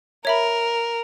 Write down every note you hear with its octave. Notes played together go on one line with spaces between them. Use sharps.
A#4 C#5 E5 B5